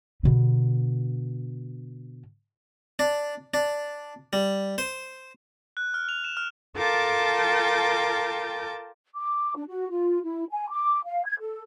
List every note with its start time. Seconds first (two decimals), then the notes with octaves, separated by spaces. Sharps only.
0.23 B2 D3
2.99 D4
3.54 D4
4.33 G3
4.78 C5
5.77 F#6
5.94 F6
6.09 F7
6.24 E7
6.37 F6
6.77 F4 A4 A#4 G5 A5 D6
9.15 D6
9.56 D4
9.67 F#4
9.90 F4
10.23 E4
10.50 G#5
10.69 D6
11.06 F5
11.26 G#6
11.40 A4